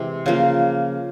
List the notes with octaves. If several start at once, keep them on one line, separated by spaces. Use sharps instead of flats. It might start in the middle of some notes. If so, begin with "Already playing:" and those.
Already playing: C3 E3 G#3 C4
C#3 F3 A#3